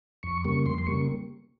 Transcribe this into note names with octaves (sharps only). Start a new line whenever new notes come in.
F2 C#6
C#3 G3 A#3 C#6
F2 C6
C6
C#3 G3 A#3 C#6